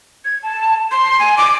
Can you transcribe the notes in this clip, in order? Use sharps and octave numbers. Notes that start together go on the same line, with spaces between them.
G#6
A5
C6
G#5
D6